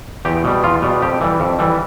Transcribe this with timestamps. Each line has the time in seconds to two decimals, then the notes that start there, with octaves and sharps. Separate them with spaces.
0.25 E2 G4
0.44 B2 G3
0.63 E2 F4
0.82 B2 G3
1.02 F2 G4
1.21 E3 G3
1.40 F2
1.59 E3 G3